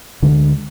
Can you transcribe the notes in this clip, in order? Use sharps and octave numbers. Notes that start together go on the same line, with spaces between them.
D2 D3 G#3 D4